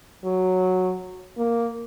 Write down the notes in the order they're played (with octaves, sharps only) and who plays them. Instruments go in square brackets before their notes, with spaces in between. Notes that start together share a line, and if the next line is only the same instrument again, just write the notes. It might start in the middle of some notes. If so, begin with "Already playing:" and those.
[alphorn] F#3
A#3